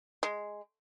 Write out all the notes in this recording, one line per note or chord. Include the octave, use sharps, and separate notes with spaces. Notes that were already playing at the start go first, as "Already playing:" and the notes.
G#3